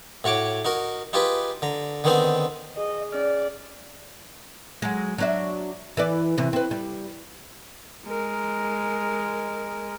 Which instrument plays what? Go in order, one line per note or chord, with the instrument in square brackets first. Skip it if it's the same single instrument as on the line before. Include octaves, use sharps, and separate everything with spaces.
[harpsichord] A2 F#4 C#5 D6
D#4 F#4 A#4
D#4 F4 G4 G#4 B4
D3 A#5
D3 D#3 B3 C4 D#4 C5
[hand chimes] G#4 [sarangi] D#5
[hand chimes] C#4 G#4 F6 [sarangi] D5
[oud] F#3 G#3
F#3 D4 E5
E3 B4 D5
C3 E3
C4 B4
G3
[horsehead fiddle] G#3 A#4